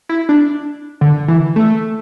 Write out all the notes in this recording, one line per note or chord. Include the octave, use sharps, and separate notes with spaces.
E4
D4
D3
E3
A3